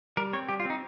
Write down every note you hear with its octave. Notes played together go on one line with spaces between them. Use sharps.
G3 A#4
C4 C#5
G3 G4
F4
C4 D#4